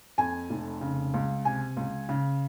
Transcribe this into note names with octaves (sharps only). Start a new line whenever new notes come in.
F2 G#5
F1
C#3
C#2
C3 G#5
C#2
C#3